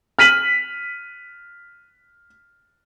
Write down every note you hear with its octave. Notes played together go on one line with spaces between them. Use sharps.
F6 B6 D#7 F#7